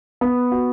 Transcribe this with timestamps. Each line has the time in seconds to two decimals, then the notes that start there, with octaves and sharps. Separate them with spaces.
0.21 B3
0.52 F#4